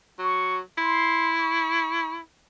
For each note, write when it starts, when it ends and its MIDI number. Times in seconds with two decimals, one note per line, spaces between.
0.19 0.61 54
0.19 0.61 85
0.78 2.19 64
0.78 1.37 84
1.39 2.16 85